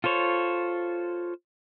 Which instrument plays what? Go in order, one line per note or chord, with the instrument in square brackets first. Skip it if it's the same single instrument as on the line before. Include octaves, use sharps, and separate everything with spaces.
[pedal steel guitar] F4 A4 C5 C#5